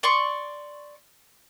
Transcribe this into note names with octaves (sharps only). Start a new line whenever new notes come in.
D5 C6 C#6